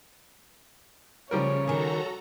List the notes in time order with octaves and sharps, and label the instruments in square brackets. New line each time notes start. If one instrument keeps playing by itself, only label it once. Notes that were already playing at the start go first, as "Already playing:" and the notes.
[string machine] C#3 [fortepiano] F3 G3 A#4 [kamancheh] C#5
[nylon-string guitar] D#3 G#4 [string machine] F#4 A4 A#5